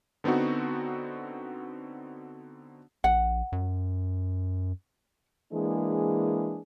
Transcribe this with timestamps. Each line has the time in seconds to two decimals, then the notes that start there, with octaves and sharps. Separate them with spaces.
0.24 D3 B3 C4 D#4 F#4
3.04 A#1 F#5
3.52 F#2
5.52 E3 G#3 A#3 D4 G#4